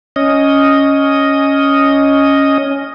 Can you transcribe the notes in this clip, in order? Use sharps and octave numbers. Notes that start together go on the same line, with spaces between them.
C#4 D#5